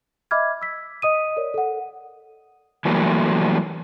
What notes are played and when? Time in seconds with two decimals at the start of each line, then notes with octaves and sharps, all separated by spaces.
0.31 D#5 E5 B5 D6 F6 G#6
0.62 E6 B6
1.02 D#5 D#6 D#7
1.37 A#4 C#5 D5
1.54 A4 F#5
2.85 E3 F#3 G3 A3 A#3